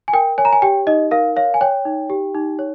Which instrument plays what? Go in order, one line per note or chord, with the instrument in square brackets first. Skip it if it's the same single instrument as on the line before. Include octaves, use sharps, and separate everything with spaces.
[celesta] G#5
A#4 G5
C#5 G#5
A#5
G#5
G4 G5
D#4 D#5
A#4 F5
C#5 F5
G#5
C#5 G5
D#4
G4
D#4
C#5